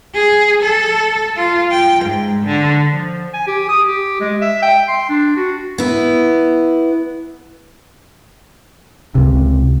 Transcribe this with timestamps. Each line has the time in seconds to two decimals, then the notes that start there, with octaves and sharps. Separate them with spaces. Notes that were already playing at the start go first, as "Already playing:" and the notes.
0.14 G#4
0.63 A4
1.36 F4
1.71 G5
2.05 G#2
2.45 D3
2.92 F3
3.34 G#5
3.48 G4
3.69 D#6
3.87 G4
4.21 G#3
4.41 E5
4.63 G5
4.88 C6
5.09 D4
5.37 F#4
5.78 B3 E4
9.15 C#2 C3